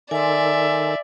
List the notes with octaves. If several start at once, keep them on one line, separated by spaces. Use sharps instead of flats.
D#3 D#4 A4 D5 E5 G#5 C6